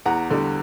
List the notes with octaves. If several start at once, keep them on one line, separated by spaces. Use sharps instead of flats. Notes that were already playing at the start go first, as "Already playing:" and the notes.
E2 F#5 A#5
D3 G3